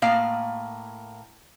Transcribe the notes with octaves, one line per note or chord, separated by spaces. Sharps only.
A2 A#3 F5